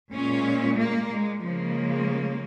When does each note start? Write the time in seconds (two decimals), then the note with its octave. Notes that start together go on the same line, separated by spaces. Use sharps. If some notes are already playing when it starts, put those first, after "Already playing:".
0.14 A#2 G#3 C#4
0.79 A#3
1.12 G#3
1.44 C#3 F3 G#3 A#3